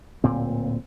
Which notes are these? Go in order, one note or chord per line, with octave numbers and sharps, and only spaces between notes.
D1 A#2 C4